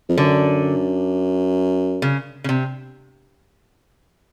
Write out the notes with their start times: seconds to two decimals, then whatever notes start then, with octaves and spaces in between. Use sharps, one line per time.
0.09 F2
0.17 F#2 D3
2.02 C#3
2.44 C#3
2.49 C3